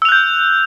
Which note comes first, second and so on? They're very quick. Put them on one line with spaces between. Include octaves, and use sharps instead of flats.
E6 F7 F#6 G6